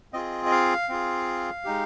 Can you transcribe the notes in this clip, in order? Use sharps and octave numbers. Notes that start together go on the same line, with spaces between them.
C4 F4 G#4 D#5
D#5
F5
C4 F4 G#4
G#3 D#4 G4